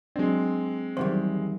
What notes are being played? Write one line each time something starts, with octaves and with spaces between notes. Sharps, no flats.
F#3 G#3 C4 D4
E2 D#3 F#3 G3 C5